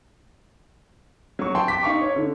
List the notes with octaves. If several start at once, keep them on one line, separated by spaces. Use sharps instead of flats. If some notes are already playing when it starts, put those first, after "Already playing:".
F#3 C#6
G5 A5 C6
D6 B6
D#4 F5 C#6 D6
C#5
D3